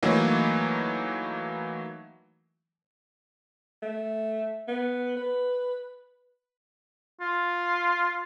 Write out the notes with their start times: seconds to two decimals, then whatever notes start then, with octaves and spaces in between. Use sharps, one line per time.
0.03 E3 F#3 A3 A#3 D#4
3.83 A3
4.68 B3
5.17 B4
7.21 F4